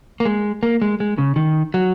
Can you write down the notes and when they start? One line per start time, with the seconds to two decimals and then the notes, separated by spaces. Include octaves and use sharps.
0.20 A#3
0.25 G#3
0.63 A#3
0.82 G#3
1.00 G#3
1.18 C#3
1.36 D#3
1.74 F#3